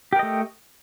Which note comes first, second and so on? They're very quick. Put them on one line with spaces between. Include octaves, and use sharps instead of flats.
G4 A#4 D#5 A3